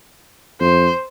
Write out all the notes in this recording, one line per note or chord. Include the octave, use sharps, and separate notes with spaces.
F2 C5